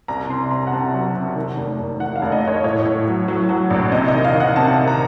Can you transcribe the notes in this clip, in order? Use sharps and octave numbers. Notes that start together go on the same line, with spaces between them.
C2 A#5
C3 C6
C3 A#5
F#5
C3 A5
F#3
C3
D#3
F1
F1
D#3 F#5
F5
F1
D#5
F1 C#5
A2 C#5
A2
F#3
F#3
F#3
A#1
C3 D#5
D#5
D#3
F5
D#3
F#5
C3 A5
D#3
A#5